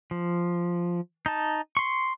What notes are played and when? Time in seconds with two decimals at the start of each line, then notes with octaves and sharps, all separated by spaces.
0.11 F3
1.26 D#4 A5
1.77 C6 C#6